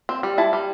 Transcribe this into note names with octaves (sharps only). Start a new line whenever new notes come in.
C4
G3
E4 A5
G3